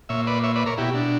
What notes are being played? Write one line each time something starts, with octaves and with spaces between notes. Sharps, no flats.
A#2 C#5 E5
B4 D5
C#5 E5
B4 D5
A#4 C#5
B2 E4 G4
D4